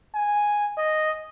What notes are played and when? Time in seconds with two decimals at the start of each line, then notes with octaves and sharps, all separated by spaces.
0.15 G#5
0.78 D#5